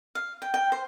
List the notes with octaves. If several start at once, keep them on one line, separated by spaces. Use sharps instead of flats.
F5
G5
G5
C5